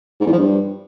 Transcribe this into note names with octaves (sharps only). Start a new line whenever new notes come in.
G#2
E2
F3
G2